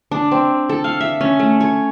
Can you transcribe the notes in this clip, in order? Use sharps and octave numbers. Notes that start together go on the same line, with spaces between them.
D4
C4
A4
F5
E5
C#4
A3
C#5